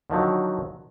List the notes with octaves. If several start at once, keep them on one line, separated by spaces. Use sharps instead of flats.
D3 D#3 F3 F#3